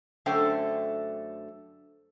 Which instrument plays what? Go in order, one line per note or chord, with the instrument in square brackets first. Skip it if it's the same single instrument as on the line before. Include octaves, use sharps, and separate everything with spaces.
[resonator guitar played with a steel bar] F#2 D3 A3 C5 G5